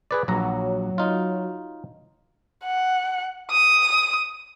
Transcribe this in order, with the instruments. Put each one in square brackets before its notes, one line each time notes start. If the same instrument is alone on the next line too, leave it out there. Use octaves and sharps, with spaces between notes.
[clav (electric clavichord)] G#4 B4 D5
[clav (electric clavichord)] A#1 A#5 [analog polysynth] F#3
[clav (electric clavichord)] D#4 F4
[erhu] F#5
D#6